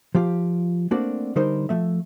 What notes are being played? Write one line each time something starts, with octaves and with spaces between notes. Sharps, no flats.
F3 F4 G4
A3 A#3 C4 D4 F#4 D5
D3 G3 D#4 A#4 C5
F3 A3 E5